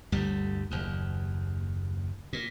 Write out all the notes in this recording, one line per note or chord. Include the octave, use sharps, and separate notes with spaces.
G1 D2 G3
F#1 D#2
A#2